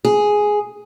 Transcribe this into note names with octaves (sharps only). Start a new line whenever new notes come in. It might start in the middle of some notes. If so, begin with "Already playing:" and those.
G#4